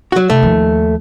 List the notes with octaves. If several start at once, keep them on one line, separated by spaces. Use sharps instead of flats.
F#3 F#4
C3 A3
D#2 F3